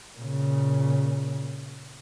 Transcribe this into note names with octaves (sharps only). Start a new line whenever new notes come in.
A#2 C#3